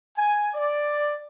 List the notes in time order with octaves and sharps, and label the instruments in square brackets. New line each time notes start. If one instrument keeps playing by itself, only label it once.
[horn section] G#5
D5